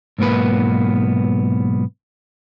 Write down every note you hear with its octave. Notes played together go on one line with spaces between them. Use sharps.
B1 G#2 A#3 B3 B4